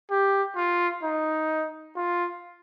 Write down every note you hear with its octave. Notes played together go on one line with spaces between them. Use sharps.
G4
F4
D#4
F4